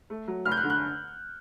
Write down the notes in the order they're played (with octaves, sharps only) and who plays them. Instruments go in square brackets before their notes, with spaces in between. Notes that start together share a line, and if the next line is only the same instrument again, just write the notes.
[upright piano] A3
F#3
F1 F6
G6
F#6
D3
F#6